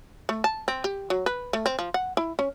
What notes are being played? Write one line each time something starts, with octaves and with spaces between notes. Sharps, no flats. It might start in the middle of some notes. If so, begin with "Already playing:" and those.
A3
A5
C4
G4
F#3
B4
A3
C4
F3
F#5
E4
C#4